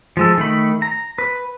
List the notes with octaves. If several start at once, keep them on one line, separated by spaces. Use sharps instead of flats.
F3 G#3 A4
D#3 A3 B5
A#5
B4